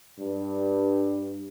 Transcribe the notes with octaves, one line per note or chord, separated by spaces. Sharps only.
G2